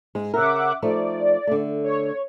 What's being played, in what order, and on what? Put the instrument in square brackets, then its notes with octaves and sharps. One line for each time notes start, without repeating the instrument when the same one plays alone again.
[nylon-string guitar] G#2 G#3
[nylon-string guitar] C#3 A#4 [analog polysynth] E5 F#5 D6
[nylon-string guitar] F3 A3 D#4 [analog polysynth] D5
[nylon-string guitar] D3 A3
[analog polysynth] C#5